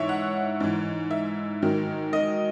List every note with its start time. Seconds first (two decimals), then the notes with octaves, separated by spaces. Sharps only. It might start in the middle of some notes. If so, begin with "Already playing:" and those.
Already playing: G#2 E3 C#5 E5
0.09 F#5
0.60 G#2 E3
1.11 E5
1.62 G#2 D#3 F#3
2.13 D#5